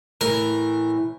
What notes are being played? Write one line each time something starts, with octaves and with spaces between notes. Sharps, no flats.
A2 E3 A#4